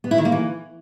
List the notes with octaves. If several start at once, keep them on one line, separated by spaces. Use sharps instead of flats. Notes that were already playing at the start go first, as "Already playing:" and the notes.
B3
E4
D#3
A#3
E3